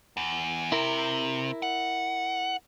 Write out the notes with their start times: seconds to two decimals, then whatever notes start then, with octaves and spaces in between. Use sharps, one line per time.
0.17 E2
0.72 C3 E4 A#4
1.62 F#5